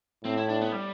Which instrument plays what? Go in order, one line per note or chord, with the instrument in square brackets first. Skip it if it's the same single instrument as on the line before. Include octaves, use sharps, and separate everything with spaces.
[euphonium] A2 [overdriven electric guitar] C4
[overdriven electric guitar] E4
D4
B3
G3